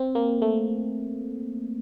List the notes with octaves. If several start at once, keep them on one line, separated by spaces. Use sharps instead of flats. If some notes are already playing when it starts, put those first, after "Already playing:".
Already playing: C4
A#3
A3